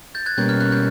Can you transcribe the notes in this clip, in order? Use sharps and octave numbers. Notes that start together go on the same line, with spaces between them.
G6 A6
F#6 G#6
B2 G3 A#3 C#4 G6
F6
F#6
G6